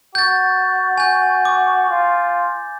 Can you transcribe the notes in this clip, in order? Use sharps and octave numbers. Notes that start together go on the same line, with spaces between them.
F#4 G6 A6
G#5 G6
D6
F4